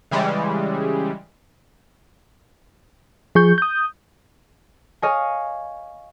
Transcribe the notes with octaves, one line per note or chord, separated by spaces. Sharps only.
C#3 E3 G3 G#3
F3 G#4 C#6 G6
D#6 G6
C#5 D#5 F5 G#5